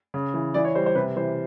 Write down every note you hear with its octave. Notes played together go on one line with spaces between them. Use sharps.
C#3
E3
E3 D5
C#5
G3 C5
C5
C3 B4
E3 C5